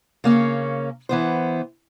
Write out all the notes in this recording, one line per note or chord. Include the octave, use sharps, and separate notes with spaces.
C#3 A#3 C#4
E3 B3 C5